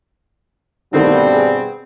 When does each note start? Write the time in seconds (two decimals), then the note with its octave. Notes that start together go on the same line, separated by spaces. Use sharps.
0.93 G2 B2 D3 D#3 A3 B3 C4
1.34 G#4